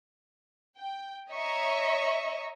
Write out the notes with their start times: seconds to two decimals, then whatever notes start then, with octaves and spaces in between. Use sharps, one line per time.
0.78 G5
1.31 C#5 D#5 E5 A#5 C#6